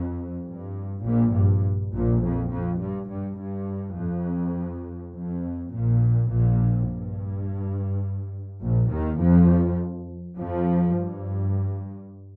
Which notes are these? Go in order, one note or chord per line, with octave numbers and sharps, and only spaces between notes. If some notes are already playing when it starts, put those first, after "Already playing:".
Already playing: F2
G2
A#1 A#2
G2
A#1 A#2
F2
F2
G2
G2
G2
F2
F2
A#1 A#2
A#1 A#2
G2
A#1 A#2
D#2 D#3
F2 F3
F2 F3
G2